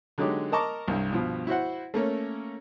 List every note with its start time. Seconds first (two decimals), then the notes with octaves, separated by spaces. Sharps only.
0.18 D3 F#3 G#3 D#4 G4
0.52 A#4 D#5 A5 A#5 C#6 D6
0.88 C2 G2
1.11 G2 B2 F3
1.47 E4 F#4 C5 F#5
1.94 A3 A#3 C#4